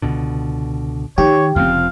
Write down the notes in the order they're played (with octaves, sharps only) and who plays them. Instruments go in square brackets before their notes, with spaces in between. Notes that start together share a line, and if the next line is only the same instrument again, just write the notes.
[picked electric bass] C#2 B2 D3
[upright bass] D#3 [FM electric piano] G4 [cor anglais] C#5
[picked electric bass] F1 F3 C4 [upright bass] C#3 [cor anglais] F5